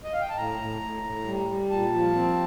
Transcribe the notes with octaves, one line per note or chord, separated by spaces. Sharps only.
D#5
F5
G5
A5
A2 A#5
A2
A2
A2
G3
G3
A#2 A5
F3
C4